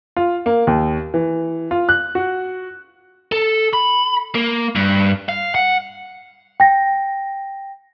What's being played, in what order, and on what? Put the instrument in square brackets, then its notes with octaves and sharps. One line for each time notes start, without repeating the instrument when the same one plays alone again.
[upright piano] F4
A#3
D#2
E3
F4
F#6
F#4
[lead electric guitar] A4
B5
A#3
G2
F5
F#5
[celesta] G5 A#6